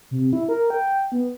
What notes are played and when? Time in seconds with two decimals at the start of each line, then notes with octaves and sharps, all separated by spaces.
0.11 C3
0.33 E4
0.49 A#4
0.70 G5
1.12 B3